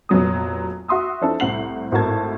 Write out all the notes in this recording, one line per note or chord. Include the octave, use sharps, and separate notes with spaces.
F1 A#2 F#3 B3 D#6
F#4 E5 C6 D#6 E6
F3 C4 D4 E4 A4
C2 A2 C4 F#5 C7 F#7
G#1 A2 F#4 A#4 A5 G#6